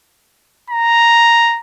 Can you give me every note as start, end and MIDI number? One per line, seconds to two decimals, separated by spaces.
0.70 1.60 82